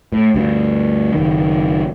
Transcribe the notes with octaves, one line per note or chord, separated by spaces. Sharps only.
A2
D2 G2
F#1 D#3